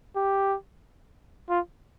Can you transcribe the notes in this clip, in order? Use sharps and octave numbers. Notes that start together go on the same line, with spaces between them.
G4
F4